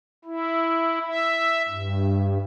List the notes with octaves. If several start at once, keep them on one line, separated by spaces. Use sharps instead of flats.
E4
E5
G2